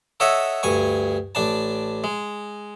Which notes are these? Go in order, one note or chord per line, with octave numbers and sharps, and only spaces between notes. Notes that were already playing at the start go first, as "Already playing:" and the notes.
A4 C#5 D#5 E5 F#5
D2 G2 G#5 C#6
A1 D4 A5
G#3